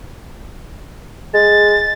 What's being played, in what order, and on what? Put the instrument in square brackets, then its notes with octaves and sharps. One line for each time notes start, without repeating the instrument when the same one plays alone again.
[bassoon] G#3 [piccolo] A6